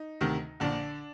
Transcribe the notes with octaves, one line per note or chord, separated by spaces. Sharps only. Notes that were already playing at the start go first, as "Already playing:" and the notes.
Already playing: D#4
D2 C3 D#3
A#1 A#2 D3 D4